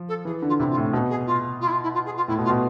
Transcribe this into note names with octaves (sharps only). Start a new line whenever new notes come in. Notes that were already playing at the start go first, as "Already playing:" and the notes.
Already playing: F3
A4
E3 G#4
D3
F4
C3 E4
F4
A2
B2 A4
G#4
F4
F4
E4
F4
E4
F4
G#4
F4
A2 E4
B2
F4
B2